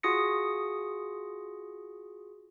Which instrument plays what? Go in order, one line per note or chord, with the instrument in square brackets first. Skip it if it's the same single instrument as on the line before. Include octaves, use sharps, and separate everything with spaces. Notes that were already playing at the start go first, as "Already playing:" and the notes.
[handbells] F4 F#4 G#4 D#6 A#6 C#7